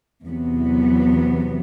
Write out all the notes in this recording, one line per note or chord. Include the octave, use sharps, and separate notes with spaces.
E2 C3 F#3 B3